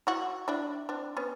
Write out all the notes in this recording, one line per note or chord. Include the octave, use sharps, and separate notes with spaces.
E4 F#4
D4 E4
C4 D4
B3 C#4